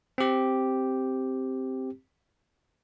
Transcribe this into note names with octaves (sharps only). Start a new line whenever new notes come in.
C4 G4